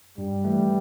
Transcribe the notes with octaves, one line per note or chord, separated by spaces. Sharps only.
G2 G3
E3 A3